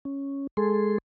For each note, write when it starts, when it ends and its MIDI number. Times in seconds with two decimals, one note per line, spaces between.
0.05 0.47 61
0.57 0.98 56
0.57 0.98 68
0.57 0.98 69
0.57 0.98 84